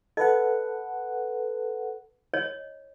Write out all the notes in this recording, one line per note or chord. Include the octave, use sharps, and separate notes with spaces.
A4 B4 D#5 F#5
C#5 D#5